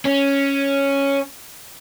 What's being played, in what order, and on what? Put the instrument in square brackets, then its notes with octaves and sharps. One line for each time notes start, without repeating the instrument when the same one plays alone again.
[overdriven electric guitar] C#4